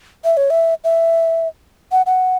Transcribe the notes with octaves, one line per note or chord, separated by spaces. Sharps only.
E5
C#5
E5
E5
F#5
F#5